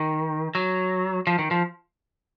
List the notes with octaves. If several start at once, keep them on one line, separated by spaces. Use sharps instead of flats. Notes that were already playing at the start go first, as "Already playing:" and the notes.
Already playing: D#3
F#3
F3
D#3
F3